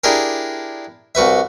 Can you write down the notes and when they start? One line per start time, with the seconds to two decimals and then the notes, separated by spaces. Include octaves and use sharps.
0.04 D4 E4 G4 G#4 A#4
1.15 C2 F#4 B4 E5